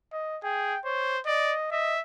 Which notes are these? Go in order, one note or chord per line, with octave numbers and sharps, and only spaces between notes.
D#5
G#4 G5
C5 C#5
D5 D#5
D#5 E5